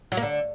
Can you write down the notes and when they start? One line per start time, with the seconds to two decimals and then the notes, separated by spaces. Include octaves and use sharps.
0.12 F#3
0.17 A#3
0.23 D3